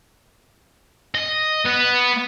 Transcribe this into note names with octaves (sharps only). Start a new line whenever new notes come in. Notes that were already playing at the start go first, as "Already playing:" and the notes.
D#5
B3